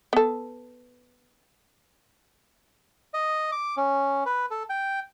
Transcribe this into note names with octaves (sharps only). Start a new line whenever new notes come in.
B3 A4
D#5
D6
C#4
B4
A4
G5